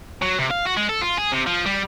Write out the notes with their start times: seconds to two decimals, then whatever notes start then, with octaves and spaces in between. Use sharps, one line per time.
0.22 F#3
0.39 C3
0.50 F5
0.65 F#4
0.77 G#3
0.89 A4
1.02 F4
1.18 G#4
1.32 C3
1.47 F3
1.66 G3